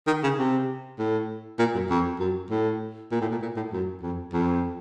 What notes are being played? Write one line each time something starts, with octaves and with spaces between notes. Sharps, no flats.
D#3
C#3
C3
A2
A#2
F#2
F2
F#2
A2
A#2
A2
A#2
A#2
A2
F#2
F2
F2